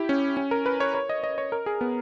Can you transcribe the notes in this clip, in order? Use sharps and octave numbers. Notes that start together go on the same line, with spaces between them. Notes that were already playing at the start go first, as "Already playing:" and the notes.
Already playing: E4 G4
C#4
C#4
A#4
B4
C#5
C#5
D#5
D#5
C#5
A#4
G#4
B3